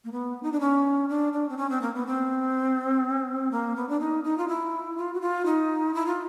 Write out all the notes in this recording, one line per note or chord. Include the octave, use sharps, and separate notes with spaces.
A#3
B3
D#4
D4
C#4
D4
D4
C4
C#4
C4
A#3
B3
C4
A#3
B3
D4
D#4
D#4
F4
E4
F4
F#4
F4
D#4
E4
F4